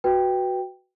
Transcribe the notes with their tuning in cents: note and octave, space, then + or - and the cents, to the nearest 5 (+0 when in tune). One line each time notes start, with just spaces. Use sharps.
F#4 +0 B4 +0 G5 +0